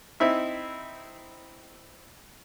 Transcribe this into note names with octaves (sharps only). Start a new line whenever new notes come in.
C4 D#4 E4 E5